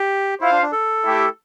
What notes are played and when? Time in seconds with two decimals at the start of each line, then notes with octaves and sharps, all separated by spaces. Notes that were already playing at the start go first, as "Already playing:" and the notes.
Already playing: G4
0.41 E4 F4 C5 F5
0.52 D4
0.62 D4
0.72 A4
1.04 A3 E4 G4